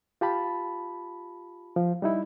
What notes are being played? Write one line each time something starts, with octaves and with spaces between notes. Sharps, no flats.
F4 G4 A5 B5
F3
G3 D#4 E4